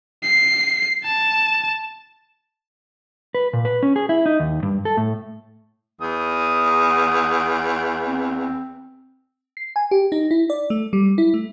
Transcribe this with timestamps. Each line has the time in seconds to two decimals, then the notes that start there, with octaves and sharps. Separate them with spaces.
0.23 C7
1.04 A5
3.35 B4
3.53 A#2
3.65 B4
3.83 C#4
3.96 G#4
4.09 E4
4.26 D#4
4.40 D#2
4.63 G2
4.85 A4
4.97 A2
6.01 E2 D#6
8.05 C4
9.57 C7
9.76 G#5
9.91 G4
10.12 D#4
10.31 E4
10.50 D5
10.70 A3
10.93 G3
11.18 E4
11.34 A3